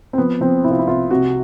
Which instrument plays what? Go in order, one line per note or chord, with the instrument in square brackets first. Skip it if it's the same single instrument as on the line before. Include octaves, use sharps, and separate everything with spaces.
[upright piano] C4
F3 B3
F3 C4
C2 E4
F4
E4
C2 F4
C3 F#4